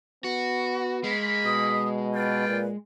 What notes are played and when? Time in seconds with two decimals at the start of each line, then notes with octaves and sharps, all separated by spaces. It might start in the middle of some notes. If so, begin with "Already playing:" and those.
0.24 B3 F#4
1.04 G#3 A#3 B5
1.46 B2 D#6
2.14 F4 B4 D5 G5
2.49 A#2